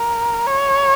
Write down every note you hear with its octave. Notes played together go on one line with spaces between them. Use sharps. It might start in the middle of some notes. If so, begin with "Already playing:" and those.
Already playing: A#4
C#5